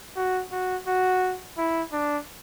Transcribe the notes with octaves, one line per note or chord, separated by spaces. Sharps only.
F#4
F#4
F#4
E4
D4